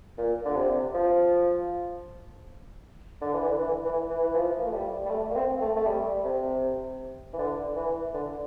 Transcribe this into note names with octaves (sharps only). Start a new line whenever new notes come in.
A#2
D3
C3
F3
D3
E3
D3
E3
E3
E3
E3
F3
A#3
A3
G3
G3
A3
A#3
C4
A3
A3
G3
C3
E3
D3
E3
D3